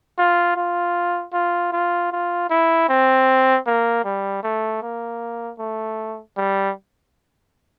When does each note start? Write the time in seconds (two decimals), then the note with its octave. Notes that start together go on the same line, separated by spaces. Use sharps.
0.18 F4
0.56 F4
1.33 F4
1.73 F4
2.12 F4
2.50 E4
2.89 C4
3.66 A#3
4.05 G3
4.43 A3
4.82 A#3
5.59 A3
6.37 G3